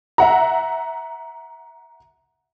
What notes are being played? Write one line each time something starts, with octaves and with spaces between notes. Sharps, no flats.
E5 F#5 A#5